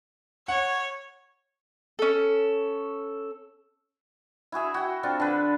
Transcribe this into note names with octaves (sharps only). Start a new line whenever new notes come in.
C#5 F#5
C#4 A4
E4 F#4 G#4 E5
F#4 G5
C4 D4 F4 A4
D3 B4